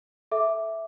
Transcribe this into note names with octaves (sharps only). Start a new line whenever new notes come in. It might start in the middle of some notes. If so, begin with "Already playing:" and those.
A4 E5 D6